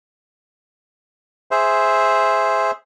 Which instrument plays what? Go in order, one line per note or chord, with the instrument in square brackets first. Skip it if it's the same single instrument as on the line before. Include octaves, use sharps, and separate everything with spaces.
[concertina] G#4 C5 E5